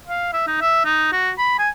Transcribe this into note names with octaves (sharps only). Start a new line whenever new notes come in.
F5
E5
D#4
E5
D#4
F#4
B5
G#5